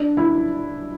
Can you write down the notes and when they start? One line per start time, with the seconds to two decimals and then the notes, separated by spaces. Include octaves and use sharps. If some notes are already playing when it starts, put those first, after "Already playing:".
Already playing: D4
0.17 E4